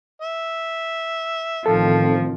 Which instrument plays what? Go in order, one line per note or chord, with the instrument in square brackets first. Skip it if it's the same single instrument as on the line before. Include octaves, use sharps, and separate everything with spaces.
[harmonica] E5
[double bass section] A1 D#3 C4 [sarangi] F3 [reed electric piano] A4